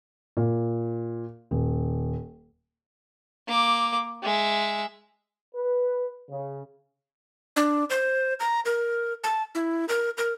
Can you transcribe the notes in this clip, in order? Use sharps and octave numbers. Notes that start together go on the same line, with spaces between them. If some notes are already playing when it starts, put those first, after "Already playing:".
A#2
D#1
A#3 D6
G#3 E5
B4
C#3
D4
C5
A#5
A#4
A5
E4
A#4
A#4